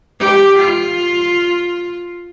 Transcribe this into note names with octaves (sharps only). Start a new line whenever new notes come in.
G4
F4